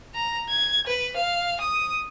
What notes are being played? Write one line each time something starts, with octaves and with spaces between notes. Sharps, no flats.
A#5
G#6
B4
F5
D#6